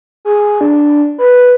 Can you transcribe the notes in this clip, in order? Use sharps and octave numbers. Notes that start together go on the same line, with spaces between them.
G#4
D4
B4